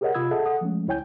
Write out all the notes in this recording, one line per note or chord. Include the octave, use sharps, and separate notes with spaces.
G4 G#4 A#4 C#5 D#5 F#5
C3 F4 B5 D#6 E6 G#6
G#4 A4 D#5 E5 F#5 A5
A4 F#5 D#6
F3 G#3 A3 C#4
C#2 E4 C#5 G5 G#5 G6